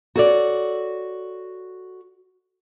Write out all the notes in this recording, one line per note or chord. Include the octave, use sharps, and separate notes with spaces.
F#4 A4 C#5 D5